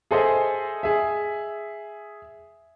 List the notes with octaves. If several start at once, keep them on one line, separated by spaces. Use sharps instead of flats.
G#4 A4 C5 D#5 E5 G#5
G#4 E5